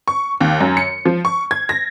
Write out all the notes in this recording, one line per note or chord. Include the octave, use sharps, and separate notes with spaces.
C#6
D#2
F#2
C#7
F3
C#6
G#6
A#6